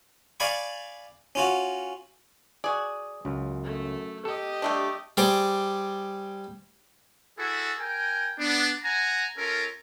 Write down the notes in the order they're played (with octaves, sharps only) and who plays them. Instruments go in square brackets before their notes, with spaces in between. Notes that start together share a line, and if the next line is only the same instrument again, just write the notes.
[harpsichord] D5 F5 G#5 B5 C#6
C#4 F4 F#4
[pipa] F#4 G#4 [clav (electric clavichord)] D5
[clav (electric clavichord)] C#2 [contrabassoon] F#2
[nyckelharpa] A3
[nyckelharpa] G4 D#5 [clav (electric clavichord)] A4
[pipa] G3 A3 D4
[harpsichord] G3 G#4 C5 D5
[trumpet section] E4 F#4 G#4 A4
A#4 G5 G#5
B3 D4
F#5 G#5 A#5
C#4 F4 A4 A#4